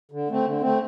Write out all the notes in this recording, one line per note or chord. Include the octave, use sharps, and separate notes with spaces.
D3
A3 C4
D3
A3 C4